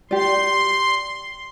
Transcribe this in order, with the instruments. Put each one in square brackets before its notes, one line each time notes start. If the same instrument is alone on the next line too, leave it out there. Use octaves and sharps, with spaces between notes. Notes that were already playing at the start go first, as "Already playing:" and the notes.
[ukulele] G4 D5 [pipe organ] C6